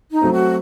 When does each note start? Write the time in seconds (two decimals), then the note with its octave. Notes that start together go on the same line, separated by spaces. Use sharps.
0.11 D#4
0.21 F#3 A3 C4
0.32 F#4